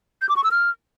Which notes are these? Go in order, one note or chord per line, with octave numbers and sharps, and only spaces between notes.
G6
D6
C#6
E6
F6